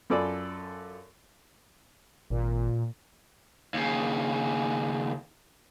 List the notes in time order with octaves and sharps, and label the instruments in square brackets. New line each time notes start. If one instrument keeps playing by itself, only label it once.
[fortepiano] F#2 F4 A4 D5 G#5 B5
[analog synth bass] G#1 [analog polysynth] A#2
[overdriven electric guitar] D#2 C#3